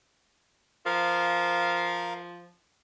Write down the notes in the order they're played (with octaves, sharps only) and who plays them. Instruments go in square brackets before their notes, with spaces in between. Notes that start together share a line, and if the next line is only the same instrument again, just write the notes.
[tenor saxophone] F3 [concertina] A#4 F5